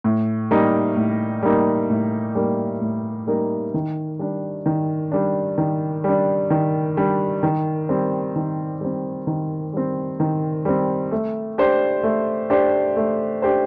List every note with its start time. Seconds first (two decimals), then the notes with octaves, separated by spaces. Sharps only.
0.04 A2
0.51 G3 A#3 D#4 A#4
0.97 A2
1.43 G3 A#3 D#4 A#4
1.90 A2
2.35 G3 A#3 D#4 A#4
2.81 A2
3.27 G3 A#3 D#4 A#4
3.74 D#3
4.19 G3 D4
4.66 D#3
5.12 G3 D4
5.58 D#3
6.04 G3 D4
6.50 D#3
6.97 G3 D4
7.43 D#3
7.89 G3 C4
8.36 D#3
8.81 G3 C4
9.27 D#3
9.73 G3 C4
10.20 D#3
10.65 G3 C4
11.11 A3
11.58 D4 G4 C5
12.03 A3
12.50 D4 G4 C5
12.96 A3
13.42 D4 G4 C5